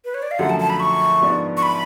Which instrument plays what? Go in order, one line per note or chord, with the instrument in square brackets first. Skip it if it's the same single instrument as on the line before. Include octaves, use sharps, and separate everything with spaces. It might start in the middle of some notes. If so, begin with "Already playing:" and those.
[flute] B4
C#5
D5
F5
[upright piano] F#2 D3 F3 A3 [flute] F#5
[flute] A5
A5
B5
C#6
[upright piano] G#2 F3 B3 D4
[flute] C#6
B5